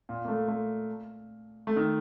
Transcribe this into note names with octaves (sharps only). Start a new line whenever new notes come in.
A#2
A#3
A3
A3
A3
D#3